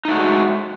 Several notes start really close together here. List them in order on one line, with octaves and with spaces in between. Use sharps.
D#4 A3 F#4 G#3